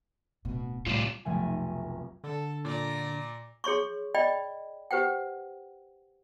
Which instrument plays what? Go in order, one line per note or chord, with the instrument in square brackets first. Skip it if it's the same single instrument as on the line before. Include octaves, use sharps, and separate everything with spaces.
[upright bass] D1 B2
[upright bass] D2 A2 [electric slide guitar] C3 G3 F4
[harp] F1 B1 A3 G#5
[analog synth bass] D3 [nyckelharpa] A4
[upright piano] A#2 [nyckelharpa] D5 A#5
[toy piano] G#4 C#5 C6 C#6
D5 D#5 G5 B5
G4 B4 C5 F#5 G5